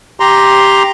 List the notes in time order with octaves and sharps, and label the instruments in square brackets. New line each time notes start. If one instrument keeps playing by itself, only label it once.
[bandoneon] G4 A#5 C6